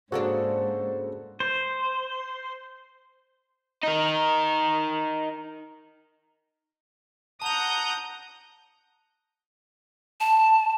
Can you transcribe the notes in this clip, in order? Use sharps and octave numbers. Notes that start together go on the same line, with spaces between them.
G#2 C#3 A#3 D4 F#4 A4 C5
C5
D#4 A#4
F#5 A5 A#5 D#6 G6 F7
A5